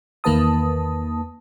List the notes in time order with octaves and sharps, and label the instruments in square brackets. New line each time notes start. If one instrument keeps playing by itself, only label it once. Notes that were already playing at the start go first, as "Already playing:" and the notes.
[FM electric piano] E2 D#3 A#3 B4 A5 D#6